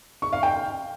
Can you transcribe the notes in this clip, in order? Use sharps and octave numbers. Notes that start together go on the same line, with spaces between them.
C#6
F5
G5